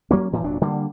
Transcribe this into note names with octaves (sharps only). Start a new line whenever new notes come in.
F#3 A#3 C#4
D2 A2 E3
F1 A#2 F#3 D4
D3 G3 A#3